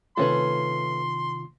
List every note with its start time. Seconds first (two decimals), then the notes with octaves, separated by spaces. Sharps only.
0.17 C3 D#3 A3 C#4 F4 B4 C6